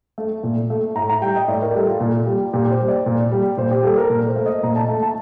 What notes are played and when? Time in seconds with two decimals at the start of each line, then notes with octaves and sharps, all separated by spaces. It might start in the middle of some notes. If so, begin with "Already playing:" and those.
0.18 A3
0.43 A#2
0.70 A3
0.96 A2 A#5
1.10 A#5
1.22 G3 G5
1.36 D#5
1.48 A2 D5
1.62 A#4
1.74 G3 A4
1.88 F4
2.00 A#2
2.26 G3
2.53 A#2 G4
2.71 C5
2.79 G3
2.88 D5
3.06 A#2
3.31 G3
3.57 A#2 C5
3.71 G4
3.84 G3 A4
3.97 A#4
4.10 A#2
4.28 C5
4.36 A3
4.46 D#5
4.63 A#2 A#5
4.76 A5
4.88 A3
5.03 A5